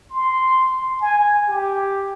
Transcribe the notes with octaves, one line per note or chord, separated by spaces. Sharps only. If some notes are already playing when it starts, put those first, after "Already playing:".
C6
G#5
G4